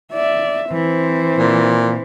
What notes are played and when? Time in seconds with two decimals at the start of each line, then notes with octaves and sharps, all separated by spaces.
0.13 D5 E5
0.72 E3 C4 C5
1.38 A#2